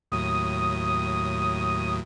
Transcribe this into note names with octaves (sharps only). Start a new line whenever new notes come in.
D#2 A2 F#3 D#6